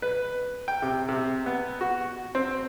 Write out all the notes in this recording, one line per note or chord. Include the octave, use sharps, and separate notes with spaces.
B4
G5
C3
C3
B3
F#4
C4